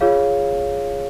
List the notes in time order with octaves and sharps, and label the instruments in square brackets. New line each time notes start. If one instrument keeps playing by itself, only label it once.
[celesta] F4 G#4 C#5 F5